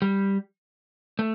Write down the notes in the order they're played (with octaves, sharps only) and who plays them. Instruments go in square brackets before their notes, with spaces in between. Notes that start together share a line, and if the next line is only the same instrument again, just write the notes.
[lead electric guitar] G3
A3